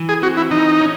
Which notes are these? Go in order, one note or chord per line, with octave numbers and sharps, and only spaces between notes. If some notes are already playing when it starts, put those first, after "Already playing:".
Already playing: E3
G#4
C4 F#4
E4
E3 D#4
C#4